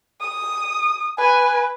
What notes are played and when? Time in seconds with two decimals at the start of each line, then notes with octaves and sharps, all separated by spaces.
0.20 D#6
1.18 B4 G#5